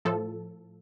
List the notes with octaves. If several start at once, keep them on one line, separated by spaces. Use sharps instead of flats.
A2 F3 A4